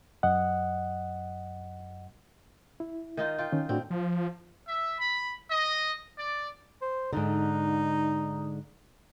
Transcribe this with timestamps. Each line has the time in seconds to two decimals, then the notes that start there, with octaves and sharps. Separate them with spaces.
0.23 F#2 D#5 F#5
2.80 E4
3.17 D#3 D#4 F4
3.38 F4 G5
3.52 D#3 C#4
3.69 A2 C4 D4 F#4
3.90 F3
4.68 E5
5.00 B5
5.51 D#5
6.19 D5
6.82 C5
7.13 G#2 D3 D#4